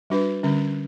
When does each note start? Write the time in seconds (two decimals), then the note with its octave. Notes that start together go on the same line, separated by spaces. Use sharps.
0.10 G3 D4 F#4 B4
0.43 D3 G3 C#4